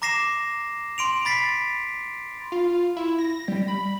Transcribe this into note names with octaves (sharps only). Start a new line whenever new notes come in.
A#5 D6 A#6 C7 E7
C6 D7 F7
B5 A6 B6 C7
F4
E4
A#6
G3
B5